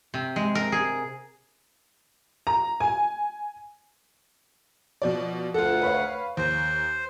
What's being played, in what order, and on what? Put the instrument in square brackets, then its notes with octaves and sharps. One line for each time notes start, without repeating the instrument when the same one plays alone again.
[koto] C3
G#3
A#4
G#4
[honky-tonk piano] A#5
G#5
B2 F3 D5
[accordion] D2 F#5 [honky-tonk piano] F4 A4
[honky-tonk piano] B4 C#5 F5
[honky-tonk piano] D#2 [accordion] C5